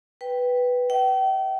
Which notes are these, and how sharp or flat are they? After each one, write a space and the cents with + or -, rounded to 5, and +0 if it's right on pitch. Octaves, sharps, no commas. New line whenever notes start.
B4 +0 G5 +0
E5 -25 G5 -40